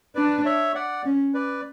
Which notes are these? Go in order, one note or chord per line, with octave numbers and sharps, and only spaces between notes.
D4 B4 D5
C#5 E5
D5 F#5
C#4
B4 D5